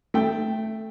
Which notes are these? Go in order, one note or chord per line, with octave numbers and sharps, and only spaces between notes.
A3 G5